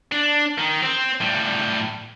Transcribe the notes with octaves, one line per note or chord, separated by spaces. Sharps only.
D4
D#3
C4
A2 G3